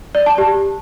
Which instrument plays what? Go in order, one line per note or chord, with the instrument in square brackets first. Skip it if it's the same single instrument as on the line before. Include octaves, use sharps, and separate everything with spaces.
[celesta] D5
A5
G4